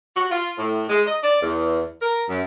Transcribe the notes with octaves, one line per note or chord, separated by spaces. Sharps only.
F#4
F4
A2
G#3
D#5
D5
E2
A#4
F#2